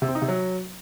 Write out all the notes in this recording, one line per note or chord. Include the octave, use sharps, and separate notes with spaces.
C3
C4
D#4
C3
F#3